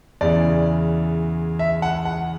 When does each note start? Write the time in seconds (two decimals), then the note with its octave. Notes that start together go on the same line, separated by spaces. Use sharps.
0.21 E2 C#3 E3 D5
1.59 E5
1.82 F#5
2.05 F#5